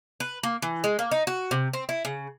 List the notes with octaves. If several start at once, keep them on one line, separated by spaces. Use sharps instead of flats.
B4
A#3
E3
G#3
A#3
D#4
F#4
C3
C4
E4
C#3